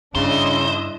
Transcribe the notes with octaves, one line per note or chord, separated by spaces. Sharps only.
G2 C#3 D4 E4 C5 D#5